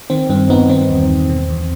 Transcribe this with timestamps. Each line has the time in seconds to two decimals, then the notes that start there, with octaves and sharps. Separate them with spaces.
0.10 D#3 C4
0.29 G2 C4
0.49 G2 B3 D#4
0.69 D#3 C4
0.90 E2
1.10 E2
1.29 B2
1.50 E2